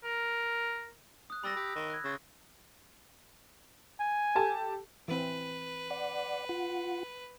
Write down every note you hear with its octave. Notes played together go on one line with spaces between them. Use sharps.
A#4
D#6 F#6
G3 B5 E6 A#6
G4
D#3
F#6 G#6
C#3
G#5
G4 A4 A5
E3 C4 B4
D5 F#5
F4 F#5